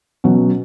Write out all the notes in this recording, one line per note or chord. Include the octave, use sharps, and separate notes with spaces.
B2 F#3 C#4